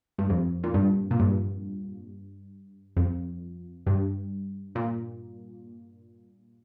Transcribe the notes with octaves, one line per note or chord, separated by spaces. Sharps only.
G2
F2
A#2
G2
A#2
G2
F2
G2
A#2